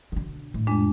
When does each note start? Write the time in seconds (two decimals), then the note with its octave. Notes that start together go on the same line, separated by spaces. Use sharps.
0.12 B2 D3
0.54 A2
0.67 F2 G#3 D4